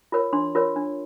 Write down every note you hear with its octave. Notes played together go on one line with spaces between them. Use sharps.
F4 A#4 C#5
D4 C6
F4 A#4 C#5
D4